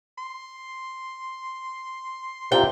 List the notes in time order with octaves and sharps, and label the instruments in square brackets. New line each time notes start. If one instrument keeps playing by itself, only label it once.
[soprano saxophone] C6
[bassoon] C3 [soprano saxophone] D4 [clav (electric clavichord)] F4 G4 A#4 [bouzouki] G5